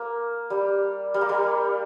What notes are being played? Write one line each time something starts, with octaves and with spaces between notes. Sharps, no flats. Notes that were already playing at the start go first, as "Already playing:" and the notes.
Already playing: A#3
G3
G3
A#3
G3